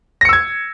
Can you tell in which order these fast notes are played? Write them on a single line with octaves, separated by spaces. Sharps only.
A#6 C#7 E6 G#6